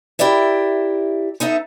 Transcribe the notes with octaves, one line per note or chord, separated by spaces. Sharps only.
E4 G4 A#4 D5 E5
B3 D#4 A4 E5